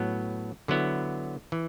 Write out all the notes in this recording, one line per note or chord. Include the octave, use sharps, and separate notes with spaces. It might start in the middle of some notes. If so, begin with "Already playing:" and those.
Already playing: A2 F#3 B3
D3 F#3 B3 E4
E3